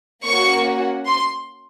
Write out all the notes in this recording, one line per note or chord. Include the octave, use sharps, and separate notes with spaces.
A#3 C#4 F#4 C#6
C6